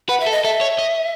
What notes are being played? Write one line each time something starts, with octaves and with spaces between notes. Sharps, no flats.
B4 F#5
E5
A4
D#5
A4 E5
C#5
D#5